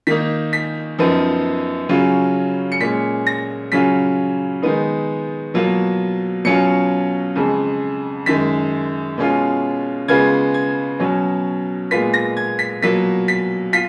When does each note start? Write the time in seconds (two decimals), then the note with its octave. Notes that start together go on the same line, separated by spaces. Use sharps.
0.07 D#3 A#3 D#4 B6
0.53 B6
0.98 F#2 F3 B3 D#4
1.89 C#3 F#3 C#4 F4
2.72 C#7
2.80 A#2 G#3 C#4 B6
3.27 A#6
3.72 C#3 F#3 C#4 F4 B6
4.62 D#3 G#3 B3 D#4
5.54 B2 F#3 A#3 F4
6.44 B2 F#3 C#4 F4 C#7
7.36 F2 C#3 G#3
8.26 F#2 D#3 G#3 B6
9.18 B2 G#3 C#4 F4
10.08 C#3 G#3 B3 F4 G#6
10.54 G#6
11.00 B2 F#3 C#4
11.91 A#2 G#3 B3 F4 B6
12.14 A#6
12.37 G#6
12.59 B6
12.82 B2 F#3 A#3 F4 B6
13.28 B6
13.73 F4 B6